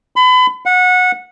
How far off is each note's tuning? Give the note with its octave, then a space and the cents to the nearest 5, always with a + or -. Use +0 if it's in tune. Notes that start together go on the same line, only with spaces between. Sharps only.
B5 +35
F#5 -20